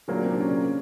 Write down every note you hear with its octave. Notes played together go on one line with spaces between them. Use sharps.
A#2 D3 F#3 A#3 D4
C3 C4
D4
C#3 C#4